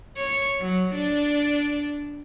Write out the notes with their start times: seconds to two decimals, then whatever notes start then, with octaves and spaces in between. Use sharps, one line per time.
0.17 C#5
0.61 F#3
0.95 D4